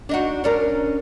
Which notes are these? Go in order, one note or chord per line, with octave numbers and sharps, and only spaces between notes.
D4 D#4 F#4
C#4 D4 A#4